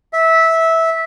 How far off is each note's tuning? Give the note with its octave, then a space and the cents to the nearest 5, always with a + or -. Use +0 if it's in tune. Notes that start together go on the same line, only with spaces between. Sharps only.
E5 -15